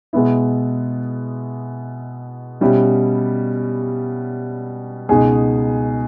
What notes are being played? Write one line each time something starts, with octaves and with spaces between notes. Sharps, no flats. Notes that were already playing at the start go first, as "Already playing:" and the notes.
B2 G#3 B3 E4
B2 G3 C#4 E4 G4
C#2 B2 G#3 D#4 G#4